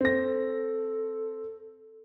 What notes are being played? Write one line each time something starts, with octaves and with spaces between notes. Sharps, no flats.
C4 A4 A#6